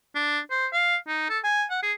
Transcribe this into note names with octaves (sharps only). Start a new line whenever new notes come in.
D4
C5
F5
D#4
A4
G#5
F#5
G#4